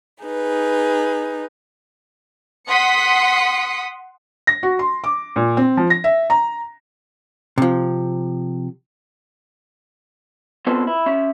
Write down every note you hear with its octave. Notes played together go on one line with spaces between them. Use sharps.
D#4 G#4 B4
F#5 C6 D#6 B6 C#7
A#6
F#4
C6
D6
A#2
C4
F3
A#6
E5
A#5
C3 F3
B3 C4 F4 A4 B4 C5
E4
C#4 E5